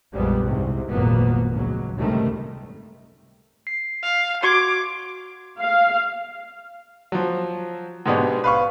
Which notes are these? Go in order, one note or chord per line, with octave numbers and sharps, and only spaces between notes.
A#1 F2 G3 G#3 B3
C2 G#2 C3
G#1 F2 A#2 F#3 A#3 B3
C#2 F#3
C#2 G2 C3 D#3 G3 A3
C7
F5
F#4 C6 D6 G#6
F5
F3 F#3
G#2 B2 G#3 B3 D4 G4
B4 F5 C#6